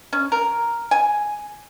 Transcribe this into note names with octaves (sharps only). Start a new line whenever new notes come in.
C#4
A#4
G#5